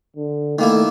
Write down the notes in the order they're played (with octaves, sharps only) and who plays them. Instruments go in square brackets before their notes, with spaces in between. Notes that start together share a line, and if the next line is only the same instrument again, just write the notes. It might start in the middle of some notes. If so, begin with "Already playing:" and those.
[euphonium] D3
[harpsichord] D#3 A#3 E4 [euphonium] A3